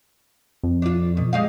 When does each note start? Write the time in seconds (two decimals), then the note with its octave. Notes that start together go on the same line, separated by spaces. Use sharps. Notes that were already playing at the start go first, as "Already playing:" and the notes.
0.63 F2
0.82 D4 F4
1.17 B2
1.33 G3 G#3 F5